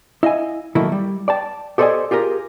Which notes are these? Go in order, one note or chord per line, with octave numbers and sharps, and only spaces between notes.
E4 D#5 F5 G#5
D#3 F#3 A3 A#3 E4
G3
D5 G5 A5
G4 A4 C5 D5 D#5 G#5
F4 G4 G#4 A#4